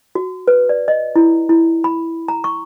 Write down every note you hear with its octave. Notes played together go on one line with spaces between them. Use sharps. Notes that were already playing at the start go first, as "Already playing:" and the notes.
F#4
B4
D5
D#5
E4
E4
B5
A#5
C#6